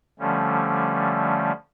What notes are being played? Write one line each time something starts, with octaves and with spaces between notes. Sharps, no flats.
D3 F3 G3 A3 C#4